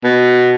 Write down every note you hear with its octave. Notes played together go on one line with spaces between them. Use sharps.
B2